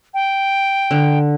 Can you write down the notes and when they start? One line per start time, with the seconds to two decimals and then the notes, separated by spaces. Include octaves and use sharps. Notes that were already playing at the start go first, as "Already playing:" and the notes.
0.14 G5
0.91 D3